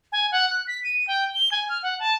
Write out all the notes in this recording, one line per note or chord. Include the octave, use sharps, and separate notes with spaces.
G#5
F#5
F#6
B6
D#7
G5
G7
G#5
F6
F#5
A5